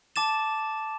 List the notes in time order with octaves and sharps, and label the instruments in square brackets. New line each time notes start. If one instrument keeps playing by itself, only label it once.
[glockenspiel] A5 D6 A6 E7